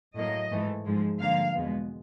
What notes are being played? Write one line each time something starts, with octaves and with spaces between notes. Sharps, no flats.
A2 F#3 A#3 D#5
G#2 E3 A3
G#2 F3 G#3
G2 D3 F3 A#3 F5
E2 B2 G#3 B3